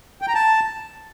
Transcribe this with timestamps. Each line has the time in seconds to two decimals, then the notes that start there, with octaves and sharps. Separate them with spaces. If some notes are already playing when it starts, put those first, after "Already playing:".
0.22 G5
0.28 A#5
0.35 A5